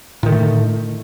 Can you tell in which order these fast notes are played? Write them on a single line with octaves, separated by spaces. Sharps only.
A2 D#3 D3 A3